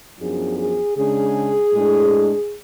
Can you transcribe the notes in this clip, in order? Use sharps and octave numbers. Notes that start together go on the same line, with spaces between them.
F#2 F3 B3 D4 G#4
G#4
C#3 G#3 D4 G#4
A2 G#3 D4